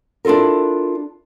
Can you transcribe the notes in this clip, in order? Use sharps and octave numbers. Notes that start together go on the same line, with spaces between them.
D4 E4 F4 A4 A#4